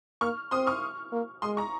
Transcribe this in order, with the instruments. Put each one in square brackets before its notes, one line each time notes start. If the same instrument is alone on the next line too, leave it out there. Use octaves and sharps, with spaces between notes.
[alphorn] A#3 [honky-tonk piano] C#6 F6
[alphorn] C4 [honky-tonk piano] C6 D#6
[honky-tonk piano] C#6 F6
[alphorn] A#3
[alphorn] G#3 [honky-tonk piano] C6 D#6
[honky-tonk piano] A#5 C#6